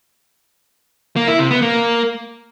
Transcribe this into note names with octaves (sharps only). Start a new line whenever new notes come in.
A#3
E4
C3
B3
A#3